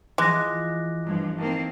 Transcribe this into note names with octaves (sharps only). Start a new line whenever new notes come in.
E3 F3 G#3 D6 F#6 A#6
G1 G2 F3 A3 G#6
D#3 A#3 C4 A5